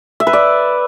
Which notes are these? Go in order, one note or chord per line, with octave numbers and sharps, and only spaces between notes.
E5
B4
D5